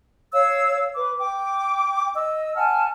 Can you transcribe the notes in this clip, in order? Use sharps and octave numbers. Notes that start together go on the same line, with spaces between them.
C#5 F5 E6
B4 D6
G5 D6
D#5 E6
F#5 G#5 A5 F6